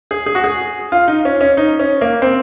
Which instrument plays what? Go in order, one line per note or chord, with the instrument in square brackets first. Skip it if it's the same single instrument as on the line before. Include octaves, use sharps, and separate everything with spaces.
[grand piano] G#4
G#4
F#4
G#4
F4
D#4
C#4
C#4
D#4
C#4
A#3
C4